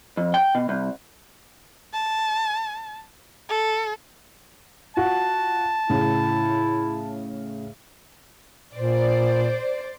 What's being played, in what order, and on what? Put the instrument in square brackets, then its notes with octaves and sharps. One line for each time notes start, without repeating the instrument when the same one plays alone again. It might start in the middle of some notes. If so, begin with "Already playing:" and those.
[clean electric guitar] F2
G5
B2
C2
[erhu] A5
A4
[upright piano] F4 F#4 [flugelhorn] A5
[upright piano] A2 C#3 [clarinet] E4
[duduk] A#2 [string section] C5 D5